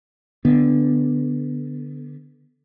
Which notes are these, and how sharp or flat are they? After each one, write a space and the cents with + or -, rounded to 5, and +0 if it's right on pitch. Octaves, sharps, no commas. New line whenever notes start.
D3 +0 B3 +0